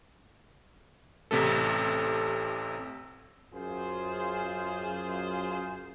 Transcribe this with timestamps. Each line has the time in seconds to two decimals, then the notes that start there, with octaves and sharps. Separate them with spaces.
1.31 A1 C3 A3 A4
3.54 F#2 F4 G#4 C5